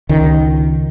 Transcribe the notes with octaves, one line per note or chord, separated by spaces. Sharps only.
C#2 D#3